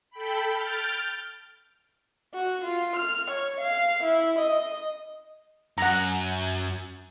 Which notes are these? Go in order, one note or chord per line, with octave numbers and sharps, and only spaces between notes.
A4 G5 B5
F6 G6 A6 D7
F#4
F4
F6
C#5
F5
E4
D#5
F#2 F#5 A#5